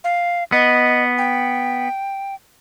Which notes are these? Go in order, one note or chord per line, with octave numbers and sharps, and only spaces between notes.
F5
B3 D#5
G5